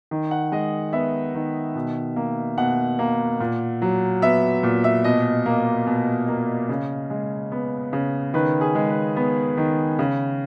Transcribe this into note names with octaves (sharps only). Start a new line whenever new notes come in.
D#3
F#5
G#3 D#5
B3 E5
D#3
B2
A#3
B2 F#5
A#3
A#2
F#3
B3 E5
A#2
E5
B2 D#5
A#3
B2
A#3
C#3
G#3
B3
C#3
D#3 B4
G#4
G#3
B4
B3
D#3
C#3